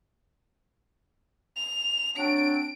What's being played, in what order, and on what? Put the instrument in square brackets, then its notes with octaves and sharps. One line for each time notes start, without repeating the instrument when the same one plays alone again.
[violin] F7
[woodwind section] F#3 C4 D4 [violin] D7